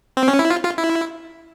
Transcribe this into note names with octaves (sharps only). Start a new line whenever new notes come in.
C4
C#4
E4
F4
F4
E4